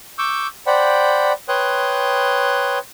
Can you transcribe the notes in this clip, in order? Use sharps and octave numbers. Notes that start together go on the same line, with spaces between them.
C#6 D6 E6 G6
C5 D5 F#5 G5 B5
B4 C#5 G5 C6 D#6 F#6